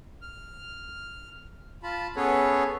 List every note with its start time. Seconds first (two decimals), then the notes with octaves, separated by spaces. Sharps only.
0.22 F6
1.83 F4 A5 B5
2.16 B3 C#4 G#4 A4 B4 C#5